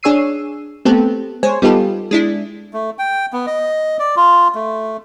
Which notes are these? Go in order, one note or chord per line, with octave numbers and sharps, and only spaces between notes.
D4 G#4 C#5 E6 C7 D#7
A3 B3 C4 G4 A4
G#3 C5 C#5 G#5
G3 B3 D#4 F4 G4 A4
G#3 D4 E4
A3
G5
B3
D#5
D5
F4
A3